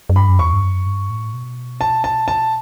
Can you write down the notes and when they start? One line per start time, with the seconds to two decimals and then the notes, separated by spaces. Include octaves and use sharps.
0.10 F#2
0.16 G2 B5
0.29 F#2
0.39 E2 C#6
0.53 G2
0.63 F#2
0.86 G2
1.10 A2
1.34 B2
1.81 A5
2.04 A5
2.28 A5